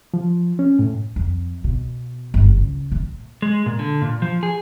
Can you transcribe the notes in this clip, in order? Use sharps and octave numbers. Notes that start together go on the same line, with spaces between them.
F3
C#4
A2
F2
B2
G1
C#2
A#2
G#3
A#2
D3
A#2
F3
G#4